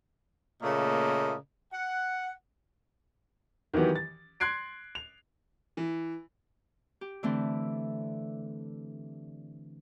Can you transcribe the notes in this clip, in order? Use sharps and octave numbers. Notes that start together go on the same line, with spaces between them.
A#2 C#3 A3 A#3 D#5
F#5
D#3 E3 F#3 B3 G4
A6
C6 F#6 G#6 C7 D7
F7
E3
G4
D3 E3 A3 C4